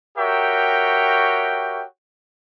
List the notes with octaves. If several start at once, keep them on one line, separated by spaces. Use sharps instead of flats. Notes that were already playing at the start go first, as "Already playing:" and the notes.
F#4 G4 A#4 C#5 E5 G5